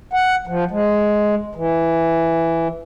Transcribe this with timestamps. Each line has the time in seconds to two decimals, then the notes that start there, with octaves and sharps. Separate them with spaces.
0.13 F#5
0.47 F3
0.71 G#3
1.55 E3